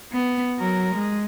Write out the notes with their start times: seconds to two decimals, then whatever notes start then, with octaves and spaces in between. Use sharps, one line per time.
0.13 B3
0.58 F#3 A#4
0.95 G#3